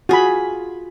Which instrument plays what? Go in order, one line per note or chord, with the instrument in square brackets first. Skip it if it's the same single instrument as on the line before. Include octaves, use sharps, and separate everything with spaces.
[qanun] F4 G#4 [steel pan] F#4 B5